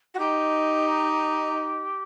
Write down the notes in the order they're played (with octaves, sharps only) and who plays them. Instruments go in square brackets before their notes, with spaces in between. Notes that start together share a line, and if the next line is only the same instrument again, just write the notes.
[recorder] F#4
[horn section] D#4 [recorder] G4